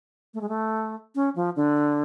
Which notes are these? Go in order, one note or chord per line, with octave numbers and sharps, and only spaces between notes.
A3
G#3
A3
C#4
F3
D3